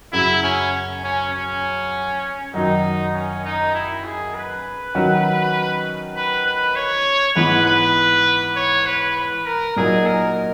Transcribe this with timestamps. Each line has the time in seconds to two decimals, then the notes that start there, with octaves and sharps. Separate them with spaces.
0.12 F#2 C#3 F#3 E4
0.43 C#4
1.03 C#4
1.33 C#4
2.54 F#2 D#3 F#3 D#4
3.14 C#4
3.45 D#4
3.74 E4
4.05 G#4
4.34 B4
4.95 D#3 F#3 C#4 F#4
6.16 B4
6.46 B4
6.75 C#5
7.36 G#2 E3 B3 B4
7.66 B4
8.56 C#5
8.86 B4
9.17 B4
9.46 A#4
9.76 A#2 F#3 A#3 D#4 G#4
10.06 A#4